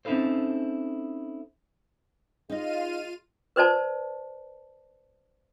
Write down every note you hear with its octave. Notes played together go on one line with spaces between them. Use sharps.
C4 C#4 D#4 E4 A4 C5
G#3 D#4 F4 D#5 F6 D#7
B4 C5 D5 A5